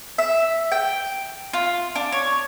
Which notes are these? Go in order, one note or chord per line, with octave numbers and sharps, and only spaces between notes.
E5
G5
F4
D4
C#5